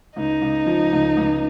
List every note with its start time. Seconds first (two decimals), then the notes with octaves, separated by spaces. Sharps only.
0.16 C#2 D#4
0.42 C#2
0.66 F3
0.92 C#2
1.17 C#2